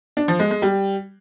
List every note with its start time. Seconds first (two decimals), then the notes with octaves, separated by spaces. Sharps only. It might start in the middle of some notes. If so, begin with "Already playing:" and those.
0.17 D4
0.28 F3
0.40 G#3
0.51 G#3
0.62 G3